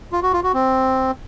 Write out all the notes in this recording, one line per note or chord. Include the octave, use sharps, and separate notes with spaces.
F4
F#4
F4
F#4
C4